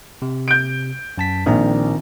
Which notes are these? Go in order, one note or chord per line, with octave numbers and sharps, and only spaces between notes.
C3
G6 D7
F#2 A5 B6
A#1 D#3 C4 A#5